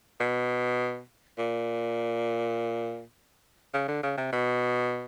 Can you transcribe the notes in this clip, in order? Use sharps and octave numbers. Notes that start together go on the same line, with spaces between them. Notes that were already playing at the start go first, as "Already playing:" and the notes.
B2
A#2
C#3
D3
C#3
C3
B2